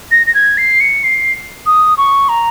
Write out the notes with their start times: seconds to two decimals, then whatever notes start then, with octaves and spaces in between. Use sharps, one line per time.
0.11 A#6
0.27 A#6
0.35 G#6
0.58 C7
0.80 C#7
1.04 C7
1.66 D#6
1.98 C#6
2.29 A#5